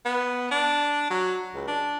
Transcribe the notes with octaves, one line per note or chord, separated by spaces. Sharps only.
B3
D4
F#3
C#2
D4